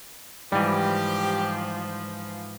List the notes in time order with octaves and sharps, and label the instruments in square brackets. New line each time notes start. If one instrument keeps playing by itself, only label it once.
[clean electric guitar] G#2 E3 [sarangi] F3 [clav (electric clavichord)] G3 [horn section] G4